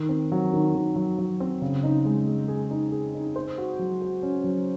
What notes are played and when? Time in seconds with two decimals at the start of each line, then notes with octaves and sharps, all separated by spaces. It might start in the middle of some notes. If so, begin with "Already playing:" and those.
Already playing: D#3
0.09 C4
0.32 F#3
0.53 D#3
0.75 D#3
0.96 F#3
1.18 F#3
1.40 C4
1.62 C#3
1.84 D#4
2.05 G#3
2.27 G#3
2.48 G#4
2.71 D#4
2.92 G#4
3.15 D#4
3.36 C5
3.58 F#4
3.79 F#3
4.01 F#4
4.23 C#4
4.44 F#3